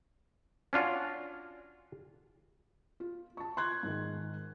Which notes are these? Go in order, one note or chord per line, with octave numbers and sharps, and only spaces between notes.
C#4 D4 F4 F#4
F4
A5 C#6
C6 F#6 G#6
G#2 D#3